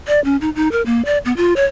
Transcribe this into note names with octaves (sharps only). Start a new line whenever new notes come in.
D5
C#4
D#4
D#4
A#4
A#3
D5
B3
F4
C#5